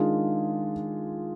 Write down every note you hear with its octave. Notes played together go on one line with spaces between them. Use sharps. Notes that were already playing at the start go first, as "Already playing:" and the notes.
Already playing: D#3 G#3 D4 F4 G#4